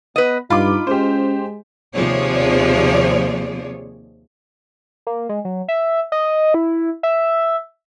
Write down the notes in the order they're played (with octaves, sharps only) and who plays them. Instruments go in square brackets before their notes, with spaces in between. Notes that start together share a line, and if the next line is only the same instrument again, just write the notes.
[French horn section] B3 [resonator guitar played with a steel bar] B4 D#5
[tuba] G2 [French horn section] D#4 [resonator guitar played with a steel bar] F4 [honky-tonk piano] B5 D6
[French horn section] G#3 [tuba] C#4 [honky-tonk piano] G4 C5
[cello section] D#2 C3 F3 G#4 C#5 D5
[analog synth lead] A#3
G#3
F#3
E5
D#5
E4
E5